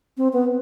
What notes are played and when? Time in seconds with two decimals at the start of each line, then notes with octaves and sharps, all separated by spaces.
0.17 C4
0.33 B3